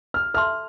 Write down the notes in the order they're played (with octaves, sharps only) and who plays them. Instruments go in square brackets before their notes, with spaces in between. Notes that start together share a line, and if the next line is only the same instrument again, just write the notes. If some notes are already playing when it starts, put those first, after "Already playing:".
[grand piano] F6
[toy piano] A4 E5 A5 C6 [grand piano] F6